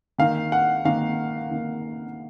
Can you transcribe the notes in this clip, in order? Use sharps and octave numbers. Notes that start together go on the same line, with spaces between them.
D#3 A#3 D#4 F5
F#5
D#3 A#3 D#4 F5
D#3 A#3 D#4